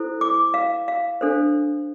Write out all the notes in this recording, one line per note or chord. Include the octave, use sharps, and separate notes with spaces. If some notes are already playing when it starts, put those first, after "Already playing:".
Already playing: E4 A4 C5
D6
F5
F5
D4 A4 C5